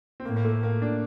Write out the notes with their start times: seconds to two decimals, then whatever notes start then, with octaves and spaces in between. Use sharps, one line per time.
0.20 C4
0.25 A2 A#3
0.36 A#3
0.45 A3
0.63 A#3
0.82 D4